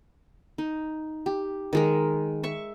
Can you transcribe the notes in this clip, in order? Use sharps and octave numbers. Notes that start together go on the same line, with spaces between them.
D#4
G4
D#3 G#3 A#4
E5 C#6